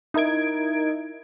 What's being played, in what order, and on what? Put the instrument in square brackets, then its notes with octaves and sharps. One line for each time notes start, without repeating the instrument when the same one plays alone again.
[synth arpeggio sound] D#4 E4 A#4 G#6 D7